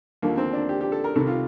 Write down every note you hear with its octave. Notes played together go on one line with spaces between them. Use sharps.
D#2 D3 F3 A#3
C4
D4
G4
G4
A4
A#4
C2 C3 D#3 A4
F4